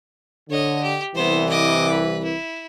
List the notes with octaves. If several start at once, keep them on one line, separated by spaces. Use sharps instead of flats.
D3 C#5 D#5
G4
C2 E3 B3 C5
D#5 D6
B4
E4